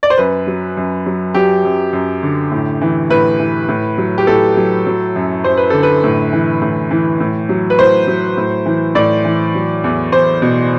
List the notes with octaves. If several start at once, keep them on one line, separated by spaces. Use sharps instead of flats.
D5
C5
F#2 B4
F#3
F#2
F#3
F#3 G4
F#2
F#2
D3
A2
E3
A2 B4
E3
A2
F#3
G4
A2 A4
F#3
F#3
F#2
F#2 C5
B4
D3 A4
B4
A2
E3
A2
E3
A2
F#3
B4
A2 C5
F#3
A2
E3
A2 D5
E3
F#3
E2
E2 C5
B2